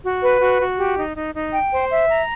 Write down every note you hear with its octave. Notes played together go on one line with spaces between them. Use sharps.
F#4
B4
F#4
F#4
G4
D#4
D#4
D#4
G5
C5
E5
A#5